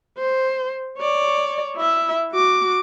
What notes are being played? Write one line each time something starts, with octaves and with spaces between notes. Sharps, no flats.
C5
C#5 D5
E4 E5
F#4 D6